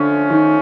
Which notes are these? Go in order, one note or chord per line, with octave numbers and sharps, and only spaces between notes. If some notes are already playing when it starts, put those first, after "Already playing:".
Already playing: D3 F3 A3 C#4
D#3